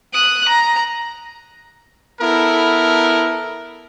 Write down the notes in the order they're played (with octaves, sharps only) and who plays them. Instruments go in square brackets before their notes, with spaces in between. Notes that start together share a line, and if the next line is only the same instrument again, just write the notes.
[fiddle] D#6 F#6
A#5
[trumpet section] B3 E4 A4 A#4